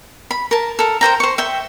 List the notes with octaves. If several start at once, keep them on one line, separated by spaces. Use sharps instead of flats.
B5
A#4 A5
A4 A#4
A#4 C5 G5 A#5
C5 C#6
E5 G5